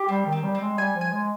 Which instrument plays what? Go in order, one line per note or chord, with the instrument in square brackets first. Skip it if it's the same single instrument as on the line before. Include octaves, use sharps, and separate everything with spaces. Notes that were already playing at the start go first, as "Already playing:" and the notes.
Already playing: [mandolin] G4
[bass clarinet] G3 [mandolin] C4
[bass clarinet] D#3
[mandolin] C4
[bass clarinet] G3
[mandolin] C4
[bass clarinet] G#3
[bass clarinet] G3 [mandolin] G#5
[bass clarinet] F3
[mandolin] G#5
[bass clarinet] G#3